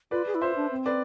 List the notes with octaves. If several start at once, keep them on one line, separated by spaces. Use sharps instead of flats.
F4 B4 D5
G#4
E4
F4 C5 E5
D4
C4
B4 D5